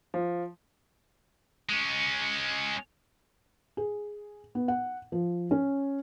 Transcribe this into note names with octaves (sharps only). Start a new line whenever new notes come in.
F3
G#3 C#4
G#4
B3
F#5
F3
C#4